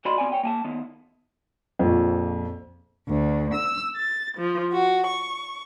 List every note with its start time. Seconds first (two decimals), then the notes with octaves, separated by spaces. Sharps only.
0.05 D#2 F#4 D5 D#5 B5 C6
0.18 B2 C4 D5 G#5
0.32 C#5 G5
0.43 A#3 G#5 A5
0.64 D#3 B3
1.79 A#1 F2
3.08 D2
3.54 E6
3.95 A6
4.36 F3
4.72 F#4
5.06 C#6